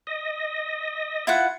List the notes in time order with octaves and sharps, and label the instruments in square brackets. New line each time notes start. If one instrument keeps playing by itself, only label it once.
[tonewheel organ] D#5
[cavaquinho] E4 F4 F#5